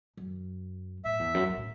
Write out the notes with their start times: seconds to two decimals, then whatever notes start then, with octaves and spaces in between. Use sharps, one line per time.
0.17 F#2
1.05 A2 E5
1.20 E2
1.34 F#2
1.49 F#2
1.57 A2